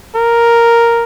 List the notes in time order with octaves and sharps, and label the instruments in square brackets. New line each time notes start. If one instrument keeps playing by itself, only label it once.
[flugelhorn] A#4